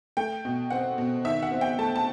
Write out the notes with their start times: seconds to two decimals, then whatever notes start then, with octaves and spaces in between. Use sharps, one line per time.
0.17 A3 G5
0.45 B2
0.70 C4 F#5
0.98 B2
1.25 D#3 E5
1.43 F#5
1.51 C4
1.61 G5
1.79 A3 A5
1.96 A5